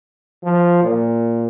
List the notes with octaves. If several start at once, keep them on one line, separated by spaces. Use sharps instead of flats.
F3
A#2